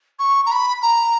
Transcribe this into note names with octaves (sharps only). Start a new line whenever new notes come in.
C#6
A#5
B5
A#5